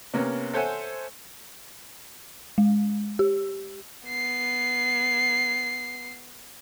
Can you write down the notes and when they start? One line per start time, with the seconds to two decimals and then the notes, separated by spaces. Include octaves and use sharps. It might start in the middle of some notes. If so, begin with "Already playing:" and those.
0.14 C3 A#3 B3 C#4
0.54 A4 C5 C#5 E5 F#5 G#5
2.58 G#3
3.19 G4
4.08 B3 C7